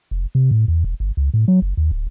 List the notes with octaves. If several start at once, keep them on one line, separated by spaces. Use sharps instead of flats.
F1
C3
A2
E2
E1
G1
C#2
A2
F#3
F#1
D#2
D1